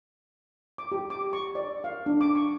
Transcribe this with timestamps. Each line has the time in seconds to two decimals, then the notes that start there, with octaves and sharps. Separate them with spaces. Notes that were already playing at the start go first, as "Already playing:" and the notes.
0.78 D6
0.92 G4
1.10 D6
1.33 C#6
1.55 D5
1.84 F5
2.06 D4
2.21 D6
2.35 C#6